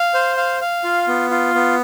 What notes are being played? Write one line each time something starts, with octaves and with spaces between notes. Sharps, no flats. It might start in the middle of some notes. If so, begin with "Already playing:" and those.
Already playing: F5
C5
F5
F5
F4
B3
F4
B3